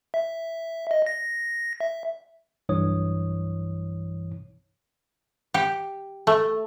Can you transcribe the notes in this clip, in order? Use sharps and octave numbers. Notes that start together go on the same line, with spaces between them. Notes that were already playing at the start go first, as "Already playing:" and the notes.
E5
E5
D#5
A#6
E5
B1 G2 E3 C#5 D#6
G4
A3